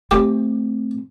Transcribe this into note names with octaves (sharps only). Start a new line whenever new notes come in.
A3 C4 G4